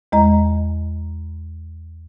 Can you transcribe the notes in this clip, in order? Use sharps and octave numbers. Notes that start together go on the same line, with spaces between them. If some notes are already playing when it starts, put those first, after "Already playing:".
E2 G#3 D#5 A#5